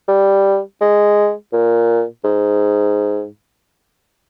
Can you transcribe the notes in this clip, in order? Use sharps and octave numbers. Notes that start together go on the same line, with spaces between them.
G3
G#3
A#2
G#2